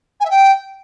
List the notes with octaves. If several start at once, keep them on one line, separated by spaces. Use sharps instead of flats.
G#5
E5
G5